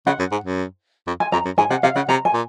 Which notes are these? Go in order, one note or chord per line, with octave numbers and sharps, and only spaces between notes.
C#3 F#5
F#2
G#2
F#2
F2
G#5
F2 A#5
F#2
G#2 G#5
C3 F#5
C3 F5
C#3 F#5
C3 A#5
G#5
A#2